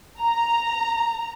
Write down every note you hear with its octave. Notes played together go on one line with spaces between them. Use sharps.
A#5